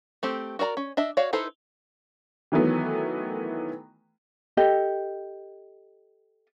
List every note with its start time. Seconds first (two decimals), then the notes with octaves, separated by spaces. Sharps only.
0.23 A3 C4 G4
0.59 F#4 A#4 D5 A#5
0.77 C#4
0.97 D4 D#5 E5
1.17 F#4 C#5 D5 F5
1.33 D#4 E4 A4 B4 C5
2.52 D#3 E3 F#3 A3 B3
4.57 G4 A4 D#5